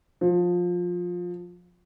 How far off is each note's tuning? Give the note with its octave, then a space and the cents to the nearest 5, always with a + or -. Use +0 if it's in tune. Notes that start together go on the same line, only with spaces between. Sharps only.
F3 +20